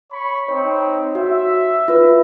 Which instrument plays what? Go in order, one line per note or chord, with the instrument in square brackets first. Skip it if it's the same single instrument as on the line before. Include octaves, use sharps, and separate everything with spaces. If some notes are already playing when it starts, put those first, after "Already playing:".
[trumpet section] C#5 B5 C#6
[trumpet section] C4 D#4 [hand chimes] C#5
[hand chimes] F#4 [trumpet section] E5
[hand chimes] F4 B4